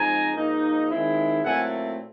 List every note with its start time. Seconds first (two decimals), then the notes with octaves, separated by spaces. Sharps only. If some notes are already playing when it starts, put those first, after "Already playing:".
Already playing: F3 G#3 C4 D#4 G#5 A#5
0.36 G#2 F3 A#3 D#4
0.90 D#3 G#3 C4 E4
1.45 A#2 F#3 A3 C4 E4 F#5 G#5